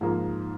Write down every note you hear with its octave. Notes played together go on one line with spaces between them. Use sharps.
G#2 F3 A#3